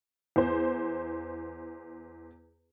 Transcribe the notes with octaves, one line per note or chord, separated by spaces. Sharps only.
E2 C5